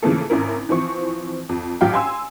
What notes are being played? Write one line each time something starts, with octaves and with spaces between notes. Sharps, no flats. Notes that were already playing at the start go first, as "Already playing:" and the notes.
C#3 E3 F3 A3 A#3 A4
G#1 C#4 E4 A#4
E3 F3 C4 C#6
F2
A1 F#3 G4 F5 G5
G#5 C6 E6